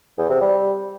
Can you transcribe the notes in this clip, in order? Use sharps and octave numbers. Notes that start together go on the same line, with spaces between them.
E2
C3
G3